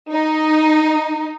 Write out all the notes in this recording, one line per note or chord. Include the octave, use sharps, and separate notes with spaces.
D#4